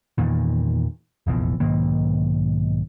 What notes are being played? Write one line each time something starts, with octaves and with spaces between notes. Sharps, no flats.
E2 A#2 D#3
F1 A#1 E2
B1 G#2 D#3 A#3